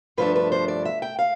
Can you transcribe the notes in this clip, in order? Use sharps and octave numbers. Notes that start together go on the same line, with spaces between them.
G2 F3 A3 D4 B4
B4
C5
D5
E5
G5
F5